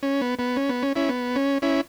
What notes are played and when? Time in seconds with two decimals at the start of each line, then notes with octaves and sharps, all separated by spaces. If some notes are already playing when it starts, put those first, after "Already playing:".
0.03 C#4
0.22 B3
0.39 B3
0.56 C#4
0.69 B3
0.83 C#4
0.96 C#4 E4
1.09 B3
1.36 C#4
1.62 C#4 E4